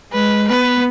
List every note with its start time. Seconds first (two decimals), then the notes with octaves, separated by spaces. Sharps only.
0.12 G#3 B4
0.48 B3 B4